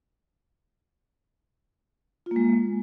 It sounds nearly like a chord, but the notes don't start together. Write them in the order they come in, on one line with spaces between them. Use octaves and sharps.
F4 A#3 G#3